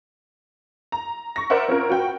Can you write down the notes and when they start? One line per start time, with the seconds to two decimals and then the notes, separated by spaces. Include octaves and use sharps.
0.92 A#5
1.36 C#6 A#6
1.50 A#4 C5 D5 E5 F#5
1.68 C4 C#4 F4 A#4
1.90 F#4 B4 G5